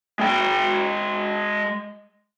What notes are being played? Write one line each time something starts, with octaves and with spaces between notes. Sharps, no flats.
G#3 G5